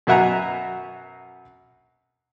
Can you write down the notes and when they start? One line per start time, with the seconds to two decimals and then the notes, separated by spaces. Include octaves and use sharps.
0.07 F#2 B2 E5 F#5 G#5 A#5